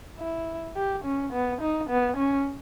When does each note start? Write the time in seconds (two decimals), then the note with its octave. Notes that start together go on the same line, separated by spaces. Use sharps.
0.19 E4
0.76 G4
1.04 C#4
1.33 B3
1.61 D#4
1.90 B3
2.17 C#4